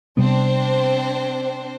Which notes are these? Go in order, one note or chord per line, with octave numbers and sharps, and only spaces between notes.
C3 G3 B3 C4 D4 C5